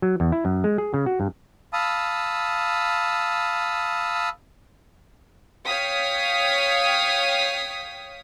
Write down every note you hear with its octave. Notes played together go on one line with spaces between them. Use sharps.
F#3
E2
E4
F#2
G#3
G#4
C#3
F#4
G2
F5 A5 B5 D#6 E6
C#5 F5 G5 D#6 B6